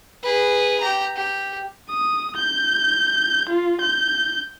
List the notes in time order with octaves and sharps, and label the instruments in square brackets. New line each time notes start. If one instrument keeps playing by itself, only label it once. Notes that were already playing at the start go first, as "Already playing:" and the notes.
[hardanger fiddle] G#4 B4
G4 A#5
G4
[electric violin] D#6
G6
F4
G6